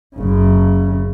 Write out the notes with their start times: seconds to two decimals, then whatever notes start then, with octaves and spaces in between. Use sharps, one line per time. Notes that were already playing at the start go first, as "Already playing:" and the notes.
0.16 F#1 C#3